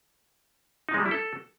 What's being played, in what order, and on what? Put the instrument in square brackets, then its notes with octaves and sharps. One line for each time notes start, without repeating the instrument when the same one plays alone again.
[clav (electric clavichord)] D#4
G#3
G3
E4
A4